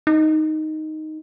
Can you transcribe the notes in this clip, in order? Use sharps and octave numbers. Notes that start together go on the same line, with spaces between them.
D#4